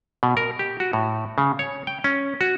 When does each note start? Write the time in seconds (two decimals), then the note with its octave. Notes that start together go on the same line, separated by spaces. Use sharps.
0.23 B2
0.37 A#4
0.59 G4
0.80 F#4
0.93 A2
1.38 C#3
1.59 C#5
1.87 G5
2.04 C#4
2.41 F#4